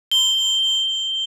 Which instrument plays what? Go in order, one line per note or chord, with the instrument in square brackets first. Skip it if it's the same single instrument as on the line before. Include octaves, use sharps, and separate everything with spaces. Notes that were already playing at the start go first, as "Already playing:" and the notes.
[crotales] G7